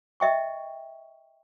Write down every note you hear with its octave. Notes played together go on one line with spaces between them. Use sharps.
D#5 E5 G5 C#6